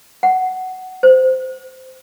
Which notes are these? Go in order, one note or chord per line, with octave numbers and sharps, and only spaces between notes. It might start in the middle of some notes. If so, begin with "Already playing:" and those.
F#5
C5